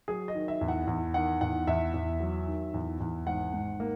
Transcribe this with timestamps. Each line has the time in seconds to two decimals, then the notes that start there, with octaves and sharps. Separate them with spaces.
0.08 F#3 G#4
0.28 D#5
0.35 D#3
0.48 E5
0.61 E2
0.68 F#5
0.88 E2
1.14 D#3 F#5
1.41 E2 F#5
1.67 E2 E5
1.94 E2
2.20 F#3
2.47 D#3
2.74 E2
3.00 E2
3.27 G#1 F#5
3.53 G#2
3.80 A#3